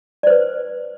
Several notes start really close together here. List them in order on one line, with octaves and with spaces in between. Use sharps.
D5 C5 B4